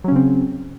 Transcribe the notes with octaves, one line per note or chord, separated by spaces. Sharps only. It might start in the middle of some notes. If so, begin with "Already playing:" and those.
C#3 F#3 C4 C#4